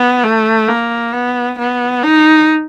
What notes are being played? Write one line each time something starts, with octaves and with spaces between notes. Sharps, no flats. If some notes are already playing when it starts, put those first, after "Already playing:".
Already playing: B3
A3
A#3
B3
B3
D#4